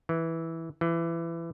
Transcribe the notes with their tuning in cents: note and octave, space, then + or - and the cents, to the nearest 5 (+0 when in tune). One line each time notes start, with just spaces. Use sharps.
E3 -10
E3 +20